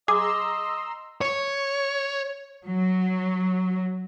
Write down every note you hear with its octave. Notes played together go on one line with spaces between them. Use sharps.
G#4 D#5 A#5 C6 D6 E6
C#5
F#3